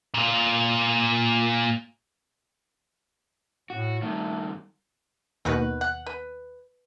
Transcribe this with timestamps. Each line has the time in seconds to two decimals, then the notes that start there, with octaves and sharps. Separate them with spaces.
0.14 A#2 F4
3.70 A2 F#4
4.02 G2 D#3 A3
5.45 D#2 B2 D#3 F#4 B4
5.81 F#5
6.06 B4